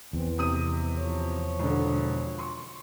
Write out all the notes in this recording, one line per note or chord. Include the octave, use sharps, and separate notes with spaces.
E2 E3 C4
F2 C3 D#6 D#7
F3 C#5
E1 D3
C6 C#6